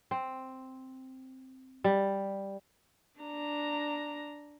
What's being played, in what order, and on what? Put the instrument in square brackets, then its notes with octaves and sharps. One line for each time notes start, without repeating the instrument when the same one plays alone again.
[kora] C4
G3
[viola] D4 A#5